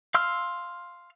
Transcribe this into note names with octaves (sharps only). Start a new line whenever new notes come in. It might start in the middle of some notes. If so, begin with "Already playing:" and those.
F5 C6 E6 F6